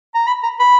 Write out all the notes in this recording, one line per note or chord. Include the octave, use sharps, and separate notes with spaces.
A#5
B5
A#5
B5